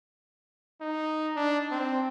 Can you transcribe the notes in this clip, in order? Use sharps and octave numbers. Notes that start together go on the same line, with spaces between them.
D#4
D4
C4